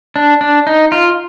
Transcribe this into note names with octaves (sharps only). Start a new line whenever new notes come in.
D4
D4
D#4
F4